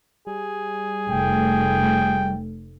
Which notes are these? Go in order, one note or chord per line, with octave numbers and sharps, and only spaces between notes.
G3 G#4
F1 A3 G5